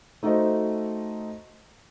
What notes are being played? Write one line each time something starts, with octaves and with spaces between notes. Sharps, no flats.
A3 D#4 F#4 A4 C5 D#5